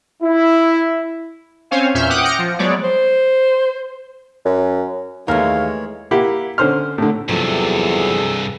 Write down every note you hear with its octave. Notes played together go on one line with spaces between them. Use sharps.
E4
C4 C#4 C5 C#5 F5 G#5
E2 A#2 C#4 E5 F6 G6
F#5 G5 D6 D#6 F#6
F6 G6 A#6 C#7 D7
F3
F#3 G#3 B3 C#5 D5
C5
F#2
D#2 E3 G#3 A3 A#4 C#5 F5 F6
A#3 E4 G4 F#5
D3 C#4 C5 C6 F6
A2 D3
E2 G2 C3 F3 F#3 G#4 A4